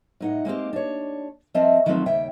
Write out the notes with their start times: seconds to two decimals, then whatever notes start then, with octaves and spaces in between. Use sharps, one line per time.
0.20 A2 D#4 F#5
0.45 G#3 A#3 C4 G4
0.73 D4 C#5
1.54 F3 C4 A#4 D#5 E5 A5
1.86 D#3 F3 F#3 A3 A#3 C4
2.06 D#2 C#3 E5 G5